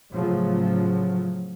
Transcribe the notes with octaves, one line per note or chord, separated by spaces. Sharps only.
A2 C#3 F3 F#3